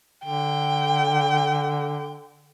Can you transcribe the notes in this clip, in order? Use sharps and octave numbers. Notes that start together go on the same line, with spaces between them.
D3 G5